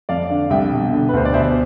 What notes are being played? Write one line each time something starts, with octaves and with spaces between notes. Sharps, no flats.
F2 D5 F5
D3
C2 E5 G5
B2
D3
B4
D2 C5
D5
B2 C5 E5